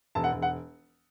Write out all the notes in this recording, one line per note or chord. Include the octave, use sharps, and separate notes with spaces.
E1 A5
F#5
E1
F#5